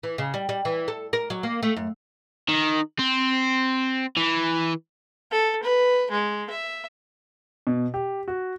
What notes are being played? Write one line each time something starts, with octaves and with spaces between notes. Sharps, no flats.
E3
C#3
G3
G3
E3
A4
A#4
F#3
A#3
A3
F#2
D#3
C4
E3
A4
B4
G#3
E5
B2
G4
F#4